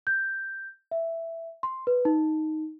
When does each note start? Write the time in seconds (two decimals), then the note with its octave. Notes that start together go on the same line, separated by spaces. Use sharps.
0.07 G6
0.91 E5
1.63 C6
1.87 B4
2.05 D#4